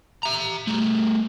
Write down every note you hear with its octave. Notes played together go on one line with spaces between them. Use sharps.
E5 A#5
G3 A3